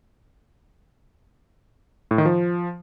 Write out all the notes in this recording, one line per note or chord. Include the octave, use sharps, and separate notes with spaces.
A2
D#3
F3